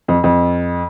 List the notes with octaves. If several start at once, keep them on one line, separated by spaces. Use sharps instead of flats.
F2
F2